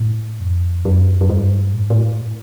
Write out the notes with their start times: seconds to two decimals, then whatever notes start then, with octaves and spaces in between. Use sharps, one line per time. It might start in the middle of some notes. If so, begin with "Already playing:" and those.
Already playing: A2
0.40 F2
0.85 F#2
1.21 F#2
1.29 G2
1.74 A2
1.82 G#2
1.90 A2